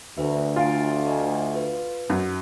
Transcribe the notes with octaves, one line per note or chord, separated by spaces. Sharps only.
D2 B4 E5
F4 G#5 A6 D7
D5 D#5 G#5
B4
F#2